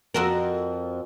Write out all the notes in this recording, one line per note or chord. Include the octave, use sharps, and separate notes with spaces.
F2 F#4 A#4